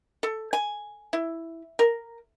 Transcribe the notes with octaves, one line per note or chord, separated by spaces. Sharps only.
A4
G#5
E4
A#4